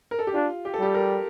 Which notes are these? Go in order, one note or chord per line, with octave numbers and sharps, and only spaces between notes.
A#4
A4
G4
D4 F4
G4
A4
G3 G4
A#4